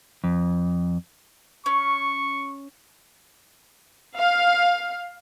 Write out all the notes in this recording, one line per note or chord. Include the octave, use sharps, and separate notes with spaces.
F2
C#4 C#6
F5